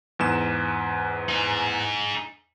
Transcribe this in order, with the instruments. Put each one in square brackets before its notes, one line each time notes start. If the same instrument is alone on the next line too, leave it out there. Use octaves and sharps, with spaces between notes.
[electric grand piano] E2 G#2 E7
[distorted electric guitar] D#4 G#4